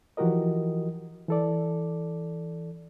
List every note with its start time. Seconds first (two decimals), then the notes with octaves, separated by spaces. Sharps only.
0.17 E3 F3 F#4 G4 A#4 D#5
1.28 E3 A4 D5